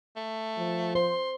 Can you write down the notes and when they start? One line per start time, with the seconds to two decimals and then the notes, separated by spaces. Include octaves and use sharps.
0.16 A3
0.58 F3
0.95 C5 C6